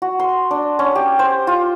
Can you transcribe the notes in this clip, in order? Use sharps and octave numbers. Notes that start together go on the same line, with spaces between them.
F#4
C6
D4
C#4
G4
C5
F4